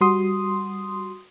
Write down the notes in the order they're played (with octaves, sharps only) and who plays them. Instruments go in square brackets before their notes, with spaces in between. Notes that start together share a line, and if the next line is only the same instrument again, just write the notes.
[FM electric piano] G3 F#4 C6 D#6